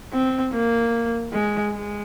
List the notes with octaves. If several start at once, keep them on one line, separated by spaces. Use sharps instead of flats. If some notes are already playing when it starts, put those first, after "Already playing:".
C4
A#3
G#3
G#3